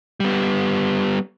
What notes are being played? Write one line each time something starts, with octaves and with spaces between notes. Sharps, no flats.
G3 B3